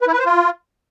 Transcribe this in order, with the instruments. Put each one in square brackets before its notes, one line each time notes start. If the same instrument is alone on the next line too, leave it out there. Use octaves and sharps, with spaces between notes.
[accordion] B4
E4
B4
C5
F4